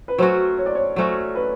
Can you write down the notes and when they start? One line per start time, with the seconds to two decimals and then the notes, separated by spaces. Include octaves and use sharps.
0.08 B4
0.18 F#3 A3 C#4 F#4 C5
0.58 C#5
0.66 D5
0.75 C#5
0.96 F#3 A3 C#4 F#4 C5
1.35 B4